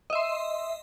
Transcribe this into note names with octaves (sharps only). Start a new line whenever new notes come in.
D#5 E5 C6